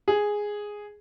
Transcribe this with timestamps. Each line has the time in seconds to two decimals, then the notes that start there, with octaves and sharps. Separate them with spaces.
0.08 G#4